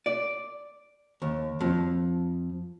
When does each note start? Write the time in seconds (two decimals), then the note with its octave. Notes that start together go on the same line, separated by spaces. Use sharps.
0.06 D5
1.22 D#2
1.61 F2